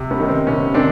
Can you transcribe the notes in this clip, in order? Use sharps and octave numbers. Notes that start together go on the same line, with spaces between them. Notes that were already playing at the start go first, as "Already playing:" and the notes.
Already playing: C3
B3 C#4
D#3
C4
C3 B3 C#4
D#3 C4 D4